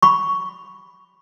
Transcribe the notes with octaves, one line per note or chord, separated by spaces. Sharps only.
B5 C#6